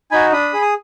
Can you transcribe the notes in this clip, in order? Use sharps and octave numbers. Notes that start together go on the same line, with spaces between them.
D#4 F#4 G#5 B5
D4 B5 D#6
G#4
D#6